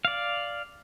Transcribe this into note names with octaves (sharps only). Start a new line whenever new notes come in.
D5 F5